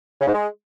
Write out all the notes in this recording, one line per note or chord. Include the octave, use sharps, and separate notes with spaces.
C#3
G#2
G#3